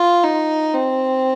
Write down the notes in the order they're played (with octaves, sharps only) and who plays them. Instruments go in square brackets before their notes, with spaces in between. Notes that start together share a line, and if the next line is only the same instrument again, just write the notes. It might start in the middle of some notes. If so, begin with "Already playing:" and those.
Already playing: [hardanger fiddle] F4
D#4
C4